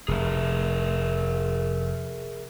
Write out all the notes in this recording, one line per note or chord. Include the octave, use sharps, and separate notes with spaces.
F1 G#4 A#4 E5